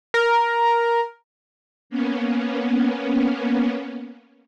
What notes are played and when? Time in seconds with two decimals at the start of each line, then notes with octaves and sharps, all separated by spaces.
0.14 A#4
1.90 A#3 B3 C#4